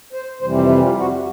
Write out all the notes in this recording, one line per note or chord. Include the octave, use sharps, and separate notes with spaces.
C5
F2 C3 E3 G3 C5
C5
B4
F4
F#4